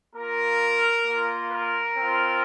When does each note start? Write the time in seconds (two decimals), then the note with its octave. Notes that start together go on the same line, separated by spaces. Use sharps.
0.15 A#3 F4 A#4
1.06 A#3 F4
1.52 A#4
1.97 C4 F4